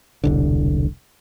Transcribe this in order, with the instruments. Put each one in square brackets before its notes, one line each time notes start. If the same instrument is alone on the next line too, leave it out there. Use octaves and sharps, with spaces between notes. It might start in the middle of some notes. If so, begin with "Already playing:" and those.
[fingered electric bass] E1 C2 D3